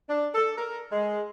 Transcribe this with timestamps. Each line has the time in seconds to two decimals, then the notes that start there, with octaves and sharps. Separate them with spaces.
0.09 D4
0.35 A4
0.58 A#4
0.92 G#3